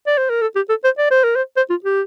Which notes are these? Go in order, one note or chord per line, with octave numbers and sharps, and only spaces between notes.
D5
C5
A#4
A4
G4
A4
C5
D5
C5
A#4
C5
C5
F4
G4